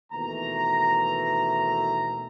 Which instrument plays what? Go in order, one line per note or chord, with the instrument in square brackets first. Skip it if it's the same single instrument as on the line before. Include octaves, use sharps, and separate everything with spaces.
[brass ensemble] D#2 B2 E3 A3 A#5